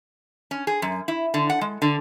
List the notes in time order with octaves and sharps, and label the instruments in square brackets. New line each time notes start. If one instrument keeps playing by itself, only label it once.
[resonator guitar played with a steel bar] C#4
G#4
F#2
E4
D3
F#5
G#3
D3